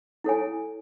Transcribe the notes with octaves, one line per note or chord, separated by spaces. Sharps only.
E4 A4 C#5 G#5